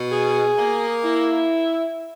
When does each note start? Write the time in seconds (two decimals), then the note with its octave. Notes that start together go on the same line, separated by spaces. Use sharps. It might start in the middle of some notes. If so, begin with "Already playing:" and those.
Already playing: B2
0.12 G#4
0.58 A#3
1.04 E4